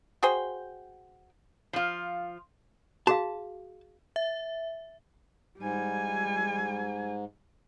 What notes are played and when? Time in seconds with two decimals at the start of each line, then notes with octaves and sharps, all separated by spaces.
0.23 F#4 G#4 C5 G5
1.73 F3 F4
3.07 F#4 G#4 F5 A5
4.16 E5
5.59 G#2 G3 G#5